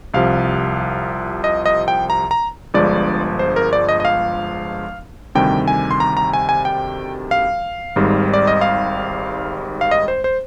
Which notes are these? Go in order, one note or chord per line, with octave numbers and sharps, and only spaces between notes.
C2 C3 F3 F5
D#5
D#5
G5
A#5
A#5
G1 G2 F3 G#3 D5
C5
A#4
D5
D#5
D#5
F5
D2 C3 D#3 G3 G5
G#5
C6
A#5
A#5
G#5
G#5
G5
F5
G#1 G#2 D#3 G3
D5
D#5
F5
F5
D#5
C5
C5